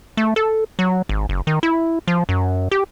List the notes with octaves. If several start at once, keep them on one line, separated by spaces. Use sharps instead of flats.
A3
A4
F#3
G#1
F#1
D#3
E4
F3
F#2
G4